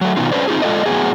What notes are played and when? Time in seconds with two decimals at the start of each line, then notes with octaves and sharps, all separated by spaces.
0.01 F#3 A3
0.17 B2 D#3 B3 D#4 F4
0.32 C#4 D4 B4 C5 D5
0.48 C4 D#4 F4 G#4
0.62 G#3 F4 A4 D5 D#5
0.86 A2 F#3 B3 G#4